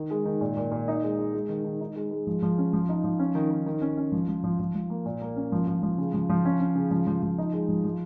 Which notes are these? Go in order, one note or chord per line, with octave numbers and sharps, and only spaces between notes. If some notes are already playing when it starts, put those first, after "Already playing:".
Already playing: D#3
G#3
D#3
A#2
A#2
A#2
D#4
G#3
G#3
G#3
D#3
D#3
D#4
G#3
G#3
F3
F3
C#4
F3
D#4
F3
C#4
D#3
D#3
D#3
C#4
C#4
F3
F3
F3
F3
F3
A#3
A#2
A#3
C#4
F3
F3
F3
C#3
F3
F3
C#4
C#4
C#3
F3
F3
F3
D#4
G#3
F3
F3